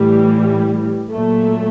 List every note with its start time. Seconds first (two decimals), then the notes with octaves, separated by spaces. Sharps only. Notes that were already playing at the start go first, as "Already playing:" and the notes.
Already playing: A2 E3 G3
1.11 A#2 F#3 A3